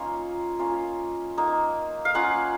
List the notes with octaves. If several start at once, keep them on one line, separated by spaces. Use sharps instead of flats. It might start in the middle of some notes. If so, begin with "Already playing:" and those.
Already playing: A#3 C#4 D#4 F4 F5
A#3 C#4 F4
A#3 D#4
F5
A#3 C#4 F4 F#5